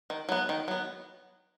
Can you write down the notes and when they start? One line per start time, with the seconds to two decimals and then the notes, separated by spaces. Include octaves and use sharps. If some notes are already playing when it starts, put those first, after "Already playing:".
0.10 D#3
0.29 F#3 B3
0.49 D#3
0.68 F#3 B3